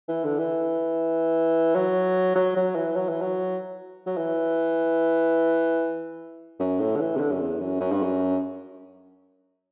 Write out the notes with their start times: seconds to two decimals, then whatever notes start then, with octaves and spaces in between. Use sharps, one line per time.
0.08 E3
0.24 D3
0.38 E3
1.75 F#3
2.35 F#3
2.56 F#3
2.75 E3
2.96 F#3
3.09 E3
3.22 F#3
4.06 F#3
4.17 E3
6.60 F#2
6.80 A2
6.96 D3
7.00 E3
7.16 C3
7.20 D3
7.31 F#2
7.40 E2
7.60 F#2
7.80 F#2
7.92 G2
8.02 F#2